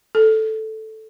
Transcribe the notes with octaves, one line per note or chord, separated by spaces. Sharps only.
A4